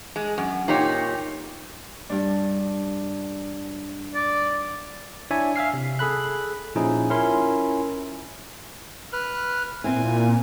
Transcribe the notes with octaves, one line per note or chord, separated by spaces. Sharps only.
G#3
F#2
A#2 D#4 G4 C#5
G2 D4
D5
D4 E4 C#5 D5 E5 G#5
E5 F5 G#5 F6 C7
C3
G#4 A4 B5 F#6
A#2 F3 C#4 D#4 E4 G#4
C#4 E4 F4 A#4 C6
B4 F6 F#6
A#2 C4 E4 G#5